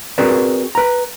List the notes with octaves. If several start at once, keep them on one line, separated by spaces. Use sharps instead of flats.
C4 F#4 G#4 A#4 B4 D5
B4 A#5